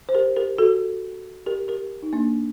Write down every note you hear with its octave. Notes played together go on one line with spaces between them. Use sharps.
C5
G4 A#4
G4 A#4
F#4 A4
G4 A#4
G4 A#4
D#4
A#3 D4